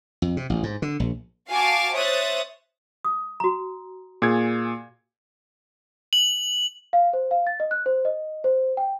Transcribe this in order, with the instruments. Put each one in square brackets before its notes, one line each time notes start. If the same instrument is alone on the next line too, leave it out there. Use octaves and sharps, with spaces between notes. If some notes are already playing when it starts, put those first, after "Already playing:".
[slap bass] F2
C3
A1
G#2
D3
A#1
[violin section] F#4 F5 G#5 A5 D6
C5 C#5 E5 D#6 F#6 A6
[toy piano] D#6
F#4 A#5
[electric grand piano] A#2 G#4 G#6
[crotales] F#7
[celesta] F5
C5
F5
A6
D#5
F#6
C5
D#5
C5
G5